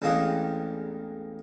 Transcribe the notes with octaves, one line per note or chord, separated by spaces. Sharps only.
A1 E2 G#2 A#3 C4 D#6